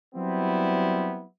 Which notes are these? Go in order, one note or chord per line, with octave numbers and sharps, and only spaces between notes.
F#3 G3 B3 C4 E4